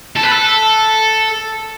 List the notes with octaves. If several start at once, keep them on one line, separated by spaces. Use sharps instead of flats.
A4
B4
A4